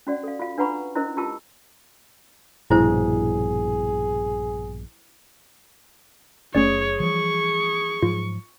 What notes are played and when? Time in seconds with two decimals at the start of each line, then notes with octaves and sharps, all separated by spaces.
0.07 C#4 F#4 D5 F#5
0.23 A4 F5
0.39 F4 F#4 F5
0.58 D4 B4 F#5 A#5 B5 C#6
0.95 C#4 E4 A#4 C5 D#5
1.17 E4 F4 G4 A5 E6
2.71 A#1 G2 B2 E4 G#4 C5
6.55 F#1 A3 C#4 G#4 C#5 D5
7.00 E3 F3 G3 C#6
8.02 G#2 F3 F#3 F4